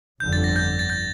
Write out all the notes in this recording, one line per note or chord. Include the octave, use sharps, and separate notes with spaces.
G1 F2 D3 G6
A6
A#6
A6
G6
A6
G6